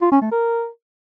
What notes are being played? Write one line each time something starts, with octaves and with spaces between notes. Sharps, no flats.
F4
C#4
A3
A#4